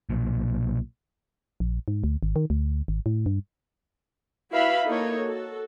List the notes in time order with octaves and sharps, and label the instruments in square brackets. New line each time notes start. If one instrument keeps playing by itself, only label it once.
[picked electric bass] B1 A#2
[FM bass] A#1
G#2
D2
G#1
D#3
D2
G#1
A2
G2
[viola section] E4 F#4 B4 E5 F5 B5
A#3 D#4 E4 A4 C#5
F#4 A4